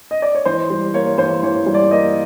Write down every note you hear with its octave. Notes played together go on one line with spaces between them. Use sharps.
D#5
D5
C#5
E3 C5
G3
A#3 C#5
E3 C5
E3 C#5
G3
D5
A#3 D#5